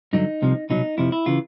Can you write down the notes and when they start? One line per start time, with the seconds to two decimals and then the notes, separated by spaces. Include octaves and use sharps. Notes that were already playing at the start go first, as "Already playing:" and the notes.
0.13 G2 D3 F#3 D#4
0.42 C2 C3 F3
0.70 C2 B2 F#3 D#4
0.98 F2 C3 F3 E4
1.12 E4
1.26 C#3 E3 F4